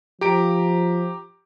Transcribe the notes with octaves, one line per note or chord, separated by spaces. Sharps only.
F3 G4 A#5 D7